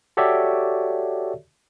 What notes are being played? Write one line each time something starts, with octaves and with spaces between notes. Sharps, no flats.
F#4 G4 A4 C#5 D5 E5